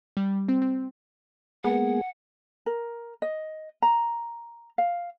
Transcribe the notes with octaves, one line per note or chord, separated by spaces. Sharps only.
G3
C4
C4
G#3 A#3 B3 G#4 F#5
A#4
D#5
A#5
F5